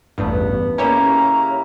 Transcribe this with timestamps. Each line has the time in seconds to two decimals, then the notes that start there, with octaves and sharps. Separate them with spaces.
0.18 A1 E2 G2 B3
0.78 C#3 A#3 C#4 E4 G4 C#5 A#5